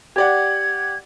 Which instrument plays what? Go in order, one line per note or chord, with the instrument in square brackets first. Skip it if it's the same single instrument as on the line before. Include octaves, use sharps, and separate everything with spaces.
[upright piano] G4 D5 F#5 [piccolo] G#6